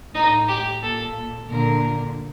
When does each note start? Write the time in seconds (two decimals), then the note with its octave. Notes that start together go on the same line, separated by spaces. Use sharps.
0.14 A2 D#4
0.48 G4
0.82 A#2 A4
1.49 A#2 D3 A#4